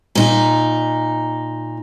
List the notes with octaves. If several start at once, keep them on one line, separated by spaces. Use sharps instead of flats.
A#2 D#4